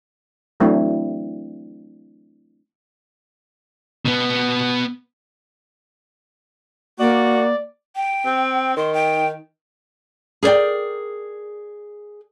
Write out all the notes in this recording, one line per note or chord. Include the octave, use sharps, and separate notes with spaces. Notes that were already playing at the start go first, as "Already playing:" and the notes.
E3 F#3 A3 C4 D4 E4
B2 B3
A#3 F#4 D5
G5
C4
D#3 C6
G5
G#4 A#4 C5 D5 G5